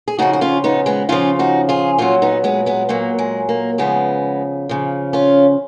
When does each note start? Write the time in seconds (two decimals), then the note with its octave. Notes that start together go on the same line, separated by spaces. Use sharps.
0.08 G#4
0.19 C#3 F3 D#4 F#4
0.33 F#4
0.41 C#4 F4
0.64 B3 D#4
0.86 G#3 B3
1.09 C#3 F3 C#4 F4
1.39 D#4 F#4
1.69 F4 G#4
1.98 A#2 F#3 C#4 F4
2.22 B3 D#4
2.44 G#3 B3
2.66 G#3 B3
2.89 A#2 F#3 A#3
3.19 G#3
3.49 A#3
3.78 C#3 F3 G#3 B3
4.69 C#3 F3
5.13 C#4 F4